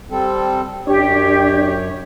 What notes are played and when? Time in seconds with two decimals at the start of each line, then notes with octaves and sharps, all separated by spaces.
0.11 G3 C4 A4
0.87 F#2 D4 G4 C#5